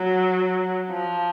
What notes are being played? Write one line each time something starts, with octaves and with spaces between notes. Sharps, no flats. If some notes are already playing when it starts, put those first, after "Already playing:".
Already playing: F#3
F3